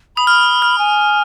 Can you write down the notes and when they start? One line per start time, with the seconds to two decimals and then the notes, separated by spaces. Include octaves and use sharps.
0.16 B5 D#6
0.27 F6
0.62 F6
0.78 G#5